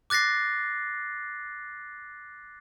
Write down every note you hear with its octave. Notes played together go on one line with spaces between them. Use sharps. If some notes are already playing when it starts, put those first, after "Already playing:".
D6 F#6 A6 A#6 C7